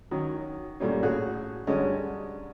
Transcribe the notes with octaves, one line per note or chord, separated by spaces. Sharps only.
D#3 F#3 C#4
F#2 A#2 G3 A3 A#3 C#4
A2 C#4 F#4 G#4 F#6
G2 D3 F#3 G#3 C#4 D#5